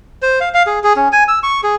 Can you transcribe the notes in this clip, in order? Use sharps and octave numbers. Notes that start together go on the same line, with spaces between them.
C5
F5
F5
G#4
G#4
C#4
G#5
E6
C#6
G#4